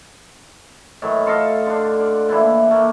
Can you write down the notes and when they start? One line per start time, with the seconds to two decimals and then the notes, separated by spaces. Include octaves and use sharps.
1.02 A2 D#3 E3 F#3
1.26 F4 A4 D#5 F5
1.66 D3 D4
2.00 D5
2.29 A#2 E3 D4 E4
2.71 A3 A#3